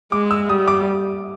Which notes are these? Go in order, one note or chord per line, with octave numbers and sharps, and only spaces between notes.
G#3 D6
E6
G3 D#6
D6